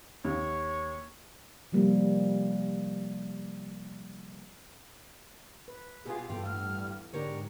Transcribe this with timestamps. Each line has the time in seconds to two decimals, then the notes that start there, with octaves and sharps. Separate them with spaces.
0.25 D#2 C#5
1.72 C3 F3 G3 A#3
5.68 B4
6.06 B2 B3 F4 G4 G#4
6.29 G2 E3 B3 F4 A4 G5
6.45 A2 F6
7.13 G#2 D3 D4 G4 A#4 C#5